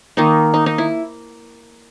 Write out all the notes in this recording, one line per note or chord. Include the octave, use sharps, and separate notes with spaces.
D#3 A#3 D#4
D#4
D#4
E4